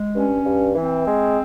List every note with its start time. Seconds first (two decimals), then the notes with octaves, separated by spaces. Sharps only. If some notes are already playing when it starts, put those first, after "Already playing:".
Already playing: G#3
0.14 G2 C#4
0.46 G2
0.75 E3 C4
1.06 G#3